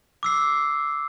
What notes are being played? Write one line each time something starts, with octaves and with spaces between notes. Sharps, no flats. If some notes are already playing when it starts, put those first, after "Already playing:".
D6 E6 C7